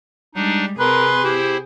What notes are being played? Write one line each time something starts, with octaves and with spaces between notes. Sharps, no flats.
G3 G#3 D4 D#4
C3 G#4 A#4 B4 C6
E4 G4 C5